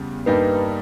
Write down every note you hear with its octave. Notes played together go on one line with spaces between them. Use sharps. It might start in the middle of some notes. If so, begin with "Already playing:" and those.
Already playing: E2 C#3 G3
G2 G3 A#3 D#4 B4